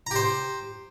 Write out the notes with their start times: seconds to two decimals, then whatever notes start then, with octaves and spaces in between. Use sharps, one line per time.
0.07 A#5
0.11 G4
0.16 C5